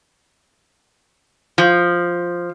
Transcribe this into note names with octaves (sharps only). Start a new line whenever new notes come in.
F3